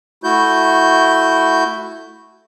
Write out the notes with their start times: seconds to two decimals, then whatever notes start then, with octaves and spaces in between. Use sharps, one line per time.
0.24 A3 E4 F#4 G6